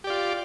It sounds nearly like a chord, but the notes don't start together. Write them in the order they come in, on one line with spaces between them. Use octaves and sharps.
G4 D5 F4